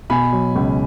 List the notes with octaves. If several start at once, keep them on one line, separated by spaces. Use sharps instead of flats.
B2 G#5 B5
F#3
C#2